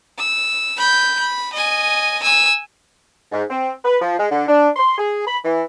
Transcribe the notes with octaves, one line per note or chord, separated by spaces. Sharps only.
E6
B5 G6
B5
D#5 G#5
G#5 E6
G#2
C4
B4
F3
G#3
D3
D4
C6
G#4
B5
E3